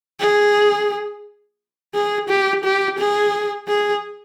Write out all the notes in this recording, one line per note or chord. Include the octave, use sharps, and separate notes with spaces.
G#4
G#4
G4
G4
G#4
G#4